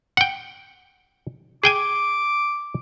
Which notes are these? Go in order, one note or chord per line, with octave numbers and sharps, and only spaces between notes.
F#5 G5
G#4 G5 G#5 D6